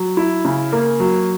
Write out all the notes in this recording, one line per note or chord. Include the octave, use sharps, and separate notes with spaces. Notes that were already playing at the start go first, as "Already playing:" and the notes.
Already playing: F#3
E4
C#3
A#3
F#3